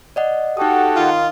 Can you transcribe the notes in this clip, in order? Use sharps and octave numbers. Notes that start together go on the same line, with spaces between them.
D5 D#5 F#5
D#4 F#4 G4 A4 D#6
D#3 F4